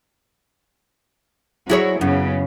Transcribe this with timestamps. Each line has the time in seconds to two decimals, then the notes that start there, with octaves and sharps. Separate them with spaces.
1.70 F#3 E4 F#4 G#4 C#5
2.01 F#2 C#3 B3